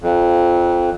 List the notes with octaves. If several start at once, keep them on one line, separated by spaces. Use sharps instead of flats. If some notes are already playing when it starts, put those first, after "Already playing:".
F2